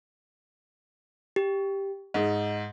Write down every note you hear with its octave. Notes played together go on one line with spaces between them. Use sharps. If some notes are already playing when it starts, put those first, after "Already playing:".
G4
G#2 D#5